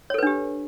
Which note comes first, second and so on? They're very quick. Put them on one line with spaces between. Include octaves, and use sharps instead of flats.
C#5 A4 B4 D4 G4